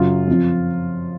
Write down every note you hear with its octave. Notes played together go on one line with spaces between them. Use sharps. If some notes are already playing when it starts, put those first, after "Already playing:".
Already playing: F#2 C#3 F#3 F4
F2 F3